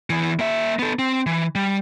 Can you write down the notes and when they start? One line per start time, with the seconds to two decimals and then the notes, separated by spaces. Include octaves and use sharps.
0.10 E2 E3
0.39 A#3 E5
0.79 B3 A4
0.99 C4
1.26 E3
1.55 G3